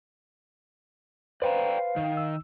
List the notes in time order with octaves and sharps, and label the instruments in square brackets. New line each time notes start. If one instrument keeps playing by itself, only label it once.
[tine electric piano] B4 C5 [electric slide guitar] D5 G5 A#5 [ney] F5
[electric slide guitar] D#3
[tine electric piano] E6